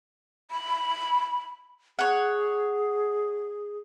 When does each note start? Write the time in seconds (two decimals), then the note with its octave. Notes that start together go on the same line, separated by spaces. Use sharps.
0.51 B5
1.99 G#4 C#5 F#5